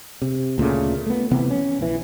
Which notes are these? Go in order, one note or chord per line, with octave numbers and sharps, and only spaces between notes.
C3
D2 A#2 C#3 A3
A3 B3
C3 E3 B3 C4
C#4
A#1 E3